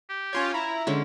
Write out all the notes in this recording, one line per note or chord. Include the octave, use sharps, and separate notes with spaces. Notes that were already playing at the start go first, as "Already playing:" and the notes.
G4
C#4 F4 C#5
E4 A#5
D3 G#3 C#4